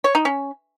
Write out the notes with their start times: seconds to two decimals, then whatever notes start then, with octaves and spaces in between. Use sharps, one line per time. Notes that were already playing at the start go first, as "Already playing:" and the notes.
0.04 C#5
0.15 D#4
0.25 C#4